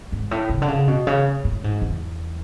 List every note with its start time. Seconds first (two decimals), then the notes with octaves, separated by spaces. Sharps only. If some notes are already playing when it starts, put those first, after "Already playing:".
0.12 G#2
0.31 A2
0.49 C#3
0.62 D3
0.68 C#3
0.88 B2
1.07 C#3
1.45 A2
1.64 G#2
1.82 E2